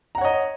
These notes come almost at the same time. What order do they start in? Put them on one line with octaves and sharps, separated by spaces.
A#5 F#5 C#5 D#5